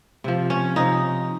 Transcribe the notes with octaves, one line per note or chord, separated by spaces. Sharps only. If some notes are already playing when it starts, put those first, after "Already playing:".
C3 F3
C#4
C3 F3 D#4